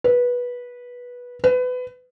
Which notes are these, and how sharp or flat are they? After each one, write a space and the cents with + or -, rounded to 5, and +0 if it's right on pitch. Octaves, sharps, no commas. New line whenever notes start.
B4 -15
B4 +25